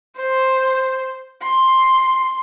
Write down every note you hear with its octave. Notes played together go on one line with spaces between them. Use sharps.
C5
C6